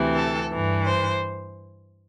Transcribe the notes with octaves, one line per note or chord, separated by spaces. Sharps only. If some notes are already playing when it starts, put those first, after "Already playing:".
Already playing: D2 C3 E3
A4
G2 E3
C5